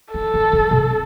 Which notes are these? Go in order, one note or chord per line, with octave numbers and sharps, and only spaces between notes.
D4 A4
D#3
D#3
C3